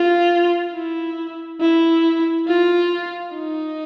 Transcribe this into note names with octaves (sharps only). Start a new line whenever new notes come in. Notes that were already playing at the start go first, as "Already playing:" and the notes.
Already playing: F4
E4
E4
F4
D#4